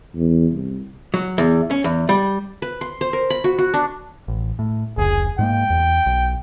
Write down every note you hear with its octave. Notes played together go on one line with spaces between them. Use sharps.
E2
C2
F#3
E2
C#4
E2
G3
B4
C6
C5
A#4
B5
F#4
F#4
D4
A1
A2
F1 C#2 G#4
G#2 G#3 A#3 G5
E2
B1